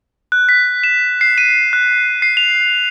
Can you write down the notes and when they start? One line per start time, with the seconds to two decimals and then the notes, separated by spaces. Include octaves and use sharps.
0.32 F#6
0.49 B6
0.84 E7
1.21 C7
1.38 D#7
1.73 F#6
2.22 C7
2.37 F7